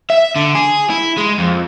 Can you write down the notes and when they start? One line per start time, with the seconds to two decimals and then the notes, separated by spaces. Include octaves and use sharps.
0.10 E5
0.36 D3
0.55 G#4
0.90 E4
1.17 G#3
1.38 F2